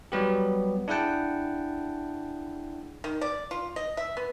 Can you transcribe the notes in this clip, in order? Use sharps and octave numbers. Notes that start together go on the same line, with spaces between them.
F#3 G3 B3 G4
D4 E4 G#4 F#5 G5 A5
D#3
D5
F4
D#5
E5
B3